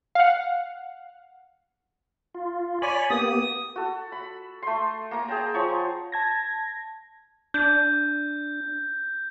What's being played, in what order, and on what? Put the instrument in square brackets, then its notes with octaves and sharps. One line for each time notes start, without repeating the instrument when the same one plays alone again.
[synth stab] F5 F#5
[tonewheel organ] F4
[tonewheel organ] C#5 D5 B5 [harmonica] G#5
[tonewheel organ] A#3 B3 G4 [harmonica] D#6
[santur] F#4 A4
B5
A3 C6
A#3 A#5
G#4 G5 A5 A#5
F3 C#5 A#5 C#6
[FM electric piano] A5 G#6 A#6
[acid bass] D4 [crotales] G6